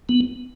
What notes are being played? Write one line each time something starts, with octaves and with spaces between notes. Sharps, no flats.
B3